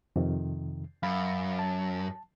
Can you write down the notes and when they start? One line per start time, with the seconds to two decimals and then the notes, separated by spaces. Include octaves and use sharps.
0.16 F2 C3 D#3
1.03 F#2 F5 B5
1.59 A5